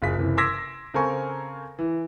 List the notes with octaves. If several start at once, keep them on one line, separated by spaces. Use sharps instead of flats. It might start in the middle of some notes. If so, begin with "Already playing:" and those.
F#1 F4 G#4 B6
F#1 C3 E3
C6 D6 E6 G#6 A#6 B6
C#3 C4 A4 A#4 G#5 C#6
E3